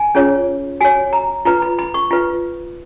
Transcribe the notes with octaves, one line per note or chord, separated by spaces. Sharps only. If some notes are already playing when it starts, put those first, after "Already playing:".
Already playing: G#5
C#4 F4 G#4 C#5
F#4 C#5 G#5
A#5
F4 B4 A#5
B5
B5
C#6
F4 B4